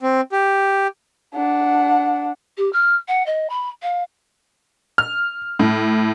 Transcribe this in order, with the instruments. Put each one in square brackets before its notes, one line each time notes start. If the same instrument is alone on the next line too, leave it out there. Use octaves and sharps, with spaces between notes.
[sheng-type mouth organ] C4
G4
[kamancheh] D4 F#5
[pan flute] G4
F6
F#5
D#5
B5
F5
[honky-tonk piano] F6
A2